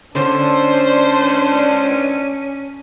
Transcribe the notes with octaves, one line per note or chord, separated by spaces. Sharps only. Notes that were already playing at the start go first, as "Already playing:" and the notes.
D3 C#4 D4 C5